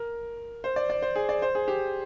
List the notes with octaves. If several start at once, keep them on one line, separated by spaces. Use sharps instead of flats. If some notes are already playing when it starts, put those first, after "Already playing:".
Already playing: A#4
C5
D5
D5
C5
G#4
D5
C5
G#4
G4